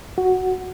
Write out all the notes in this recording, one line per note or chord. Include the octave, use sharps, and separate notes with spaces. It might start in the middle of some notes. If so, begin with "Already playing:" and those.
F#4